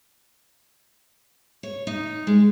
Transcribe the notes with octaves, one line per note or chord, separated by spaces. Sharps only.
C#5
D#4
G#3